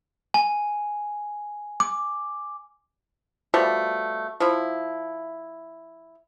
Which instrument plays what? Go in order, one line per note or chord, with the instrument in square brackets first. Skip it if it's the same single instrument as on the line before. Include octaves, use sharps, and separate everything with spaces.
[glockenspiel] G#5
D6
[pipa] B2 F3 G3 A3
F3 E4